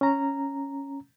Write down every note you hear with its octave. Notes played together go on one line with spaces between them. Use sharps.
C#4 A#5